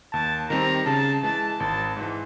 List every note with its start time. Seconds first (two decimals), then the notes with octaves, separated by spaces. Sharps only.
0.13 D#2 A5
0.50 D#3 G3 C4 A#5
0.86 C#3 A5
1.23 E3 G#3 A5
1.60 G#1 A5
1.97 G#2 E3